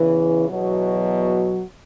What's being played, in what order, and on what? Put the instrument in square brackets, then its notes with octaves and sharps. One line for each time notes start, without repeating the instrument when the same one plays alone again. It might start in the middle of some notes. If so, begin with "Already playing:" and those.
Already playing: [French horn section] E2 C#3 E3
E2 B2 F#3